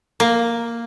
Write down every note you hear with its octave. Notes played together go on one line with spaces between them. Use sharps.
A#3